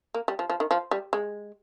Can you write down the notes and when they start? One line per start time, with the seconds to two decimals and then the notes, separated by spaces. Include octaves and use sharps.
0.14 A#3
0.28 G3
0.39 F3
0.50 F3
0.60 D#3
0.71 F3
0.91 G3
1.13 G#3